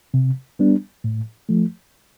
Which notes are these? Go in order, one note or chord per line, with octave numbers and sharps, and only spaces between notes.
C3
G3 B3 D4
A2
F3 A3